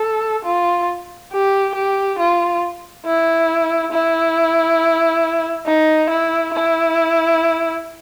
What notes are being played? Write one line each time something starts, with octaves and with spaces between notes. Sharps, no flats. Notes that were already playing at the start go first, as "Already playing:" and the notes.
Already playing: A4
F4
G4
G4
F4
E4
E4
D#4
E4
E4